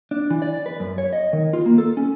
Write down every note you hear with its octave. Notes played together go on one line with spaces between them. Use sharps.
D4
E3
D5
B4
F#2
C#5
D#5
D#3
F4
A#3
A4
C#4